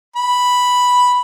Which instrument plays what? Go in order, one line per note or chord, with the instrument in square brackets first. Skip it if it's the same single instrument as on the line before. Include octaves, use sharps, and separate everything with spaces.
[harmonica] B5